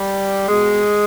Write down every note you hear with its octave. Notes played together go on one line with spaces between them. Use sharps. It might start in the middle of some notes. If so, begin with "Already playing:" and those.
Already playing: G3
B2 G#3